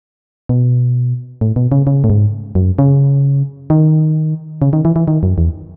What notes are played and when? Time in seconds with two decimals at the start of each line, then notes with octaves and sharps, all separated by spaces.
0.49 B2
1.41 A2
1.56 B2
1.72 C#3
1.87 C#3
2.04 A2
2.10 G#2
2.55 F#2
2.79 C#3
3.70 D#3
4.62 C#3
4.73 D#3
4.85 E3
4.96 E3
5.08 D#3
5.23 F#2
5.38 E2